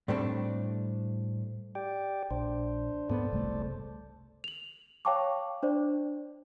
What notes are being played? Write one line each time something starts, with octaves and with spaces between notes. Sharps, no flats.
A2 G3 A3 C4 D4
G4 D5 G5
A#1 D4 C5
G#2 B3 A4 C5 D5
F#1 C2 A3
F7 F#7
C#5 F5 G5 A5 C#6 D6
D4 C5 D5